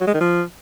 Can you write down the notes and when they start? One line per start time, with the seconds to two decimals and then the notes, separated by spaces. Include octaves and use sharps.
0.01 F#3
0.07 G#3
0.14 D#3
0.21 F3